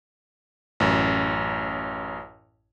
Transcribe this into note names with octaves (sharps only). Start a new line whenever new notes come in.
A1 F#2